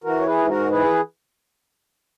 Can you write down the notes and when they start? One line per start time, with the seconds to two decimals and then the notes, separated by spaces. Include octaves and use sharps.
0.04 E3 F#4 A#4
0.20 C#5
0.26 G#4 B4
0.38 G#2
0.48 F#4 A#4
0.70 E3 G#4 B4